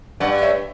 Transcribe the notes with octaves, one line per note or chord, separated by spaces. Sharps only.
G2 D5 F#5
C#5 E5